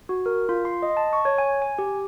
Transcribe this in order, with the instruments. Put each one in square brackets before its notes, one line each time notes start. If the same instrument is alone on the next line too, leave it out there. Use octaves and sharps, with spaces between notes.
[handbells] F#4
A#4
F4
C6
D#5
A5
C#6
C#5
G#5
G#5
G4